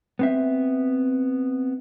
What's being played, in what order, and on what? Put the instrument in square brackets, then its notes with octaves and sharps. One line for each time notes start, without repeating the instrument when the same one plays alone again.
[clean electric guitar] B3 C4 E5